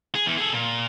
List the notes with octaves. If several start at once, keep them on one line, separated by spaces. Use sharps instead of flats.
G#4
E2
G#4 A4
A#2